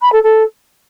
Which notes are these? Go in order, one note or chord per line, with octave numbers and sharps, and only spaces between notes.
B5
A4
A4